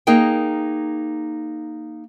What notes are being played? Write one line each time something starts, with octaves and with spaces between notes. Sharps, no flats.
A#3 D#4 G#4 A#4 G5